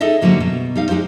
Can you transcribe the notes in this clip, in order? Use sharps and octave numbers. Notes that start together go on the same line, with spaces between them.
D#4 G#4 A4 D#5 E5
G#2 D3 F#3 G3 A3 A#3
B2
G3 D#4 F5
G#3 D#4 G4 C5